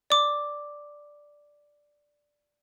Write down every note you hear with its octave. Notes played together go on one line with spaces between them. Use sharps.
D5 D6